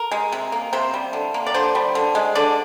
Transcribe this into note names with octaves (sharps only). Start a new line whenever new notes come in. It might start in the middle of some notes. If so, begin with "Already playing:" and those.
Already playing: A#4
G#3
C3
A#3
C3 C5
G3
D3
A#3
D5
D3 C5
G3
D3
G#3
D3 D5